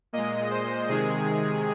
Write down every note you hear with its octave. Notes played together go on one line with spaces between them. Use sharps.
A#2 G#3 D#5
C5
C3 D#3 G#3 G#4